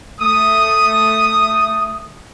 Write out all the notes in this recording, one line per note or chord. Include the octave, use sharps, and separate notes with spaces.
A3 D#6